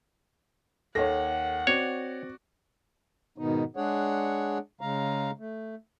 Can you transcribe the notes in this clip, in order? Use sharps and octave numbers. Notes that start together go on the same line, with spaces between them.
D#2 A4 C#5 F#5 A#6
C4 F#4 C#5 D5
G#2 B2 D#3 B3 D#4
G#3 D4 G#4 C#5 F#5
C#3 G#3 F5 A#5
A3